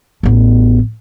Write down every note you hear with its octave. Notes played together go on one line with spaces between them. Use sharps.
A1 B3